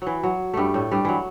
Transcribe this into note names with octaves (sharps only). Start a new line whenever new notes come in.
E3 F#3
F#3
G2 G3 A3
A2 A3
G2 G3
E3 F#3